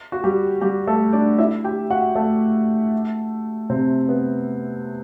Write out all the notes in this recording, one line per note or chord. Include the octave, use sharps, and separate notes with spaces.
F#4
G3 G4
G3 G4
A3 A4
D4 D5
E4 E5
G4 G5
F#4 F#5
A3 A4
C3 C4
B3